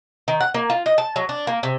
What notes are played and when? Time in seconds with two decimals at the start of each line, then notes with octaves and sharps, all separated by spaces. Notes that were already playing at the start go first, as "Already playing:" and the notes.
0.28 D#3
0.40 F#5
0.54 A#3
0.70 F4
0.86 D#5
0.98 A5
1.16 F#3
1.29 D4
1.47 A#3
1.63 C3